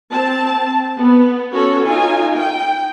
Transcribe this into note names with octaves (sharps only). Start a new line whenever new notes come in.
C4 A5
B3
C#4 F#4 A4 C#5
D#4 F4 G#5
G5